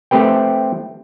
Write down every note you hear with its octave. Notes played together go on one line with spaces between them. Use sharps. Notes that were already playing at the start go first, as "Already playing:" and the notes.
A3 C4 G4 B4 G5